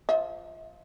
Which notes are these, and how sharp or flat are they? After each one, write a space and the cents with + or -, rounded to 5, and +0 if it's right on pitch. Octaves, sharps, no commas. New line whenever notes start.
F3 +0 E5 -45